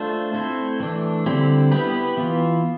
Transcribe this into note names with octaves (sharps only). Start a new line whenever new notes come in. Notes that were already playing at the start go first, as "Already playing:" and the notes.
Already playing: A3 D4 F4 A4 C5
A3 C4 E4 A4 C5
E3 A3 D4
D3 G3 C4 E4 G4
B3 E4 G4 B4
E3 B3 F4